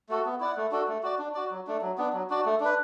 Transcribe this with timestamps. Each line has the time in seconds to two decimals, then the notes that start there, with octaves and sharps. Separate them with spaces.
0.09 A3 F#4 A4
0.25 B3
0.40 E4 D5 F#5
0.57 A3
0.71 D4 F#4 A4
0.88 A3
1.03 F#4 D5
1.19 D4
1.35 F#4 D5
1.51 F#3
1.67 A3 D4
1.82 F#3
1.98 B3 D4
2.13 F#3
2.30 D4 F#4 D5
2.45 A3
2.60 D4 B4